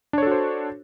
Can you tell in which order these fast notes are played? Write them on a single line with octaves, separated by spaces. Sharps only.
D4 C#5 A4 F#4 C5